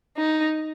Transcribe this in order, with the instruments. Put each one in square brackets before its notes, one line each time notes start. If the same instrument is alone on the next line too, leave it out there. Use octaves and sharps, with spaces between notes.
[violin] D#4